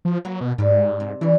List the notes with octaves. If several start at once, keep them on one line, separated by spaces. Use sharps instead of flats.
F3
F#3 A#3 B4
B2
G#2 G3 B4
C3
E3 C#4 D4